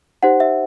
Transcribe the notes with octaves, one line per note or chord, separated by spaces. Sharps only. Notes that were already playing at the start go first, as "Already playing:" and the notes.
D#4 G4 C5 F#5
E5